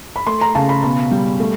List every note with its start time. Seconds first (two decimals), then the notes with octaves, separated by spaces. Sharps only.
0.16 B5
0.27 A3 C6
0.41 A#5
0.55 C#3 A5
0.69 B5
0.83 B2 B5
1.11 G3
1.40 A3